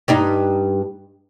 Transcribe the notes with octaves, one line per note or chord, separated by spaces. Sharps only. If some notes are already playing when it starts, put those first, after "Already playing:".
G2 G3 D#4